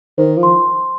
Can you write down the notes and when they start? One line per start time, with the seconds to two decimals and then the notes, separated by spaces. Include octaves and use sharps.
0.18 D#3 C5
0.37 F3
0.43 C6